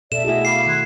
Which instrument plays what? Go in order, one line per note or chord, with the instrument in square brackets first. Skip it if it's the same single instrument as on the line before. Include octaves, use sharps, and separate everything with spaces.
[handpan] B2 A4 [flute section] D5 E5 [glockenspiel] E7
[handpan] A3 E4 F#4 [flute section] G#4 D#5 E5
[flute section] F5 B5 D6 [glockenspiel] C7
[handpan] D#3 [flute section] C6 F#6 G#6